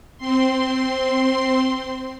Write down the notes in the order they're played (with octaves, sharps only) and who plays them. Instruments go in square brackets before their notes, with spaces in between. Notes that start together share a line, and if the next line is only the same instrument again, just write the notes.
[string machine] C4 C6